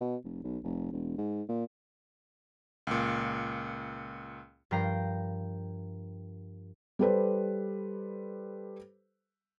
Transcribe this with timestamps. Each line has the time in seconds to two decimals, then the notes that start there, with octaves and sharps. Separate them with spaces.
0.01 B2
0.24 F1
0.44 B1
0.64 F1
0.92 E1
1.18 G#2
1.49 A#2
2.87 C#2 A#2
4.71 G2 F3 A#4 G5 A#5 C7
6.99 G3 G4 A4 B4 C5